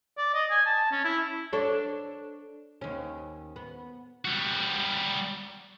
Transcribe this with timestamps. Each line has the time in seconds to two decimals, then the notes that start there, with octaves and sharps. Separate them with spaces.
0.18 D5
0.34 D#5
0.51 G#5
0.66 A5
0.91 C#4
1.04 E4
1.53 D4 A4 C#5
2.81 D#2 C#4
3.56 B3
4.25 G3 F#4